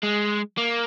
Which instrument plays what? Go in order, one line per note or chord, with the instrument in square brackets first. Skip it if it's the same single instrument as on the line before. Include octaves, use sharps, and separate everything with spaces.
[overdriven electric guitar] G#3
A#3